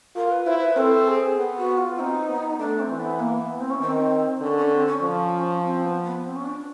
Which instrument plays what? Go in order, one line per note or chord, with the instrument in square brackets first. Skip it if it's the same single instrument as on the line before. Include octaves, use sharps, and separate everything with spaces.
[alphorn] F4 [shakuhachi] A#4
[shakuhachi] B4
[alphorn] E4 [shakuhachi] C5
[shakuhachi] B4
[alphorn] C4 [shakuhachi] A4
[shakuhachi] G#4
[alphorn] B3
[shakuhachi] F#4
F4
[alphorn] C4 [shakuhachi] D#4
[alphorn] B3
[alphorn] A3 [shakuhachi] D4
[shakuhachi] C4
[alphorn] E3
[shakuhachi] B3
A#3
B3
C4
C#4
[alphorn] D#3 [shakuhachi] C4
[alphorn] D3 [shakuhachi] C#4
[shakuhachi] C#4
C4
C#4
[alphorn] F3
[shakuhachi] C4
B3
B3
C4
C#4
D4